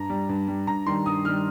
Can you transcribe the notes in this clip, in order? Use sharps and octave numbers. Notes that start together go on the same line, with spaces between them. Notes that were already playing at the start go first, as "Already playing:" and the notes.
Already playing: G2 A#5
G3
G2
G3
G2 A#5
D#3 G3 C6
G2 D#6
D#3 G3 F6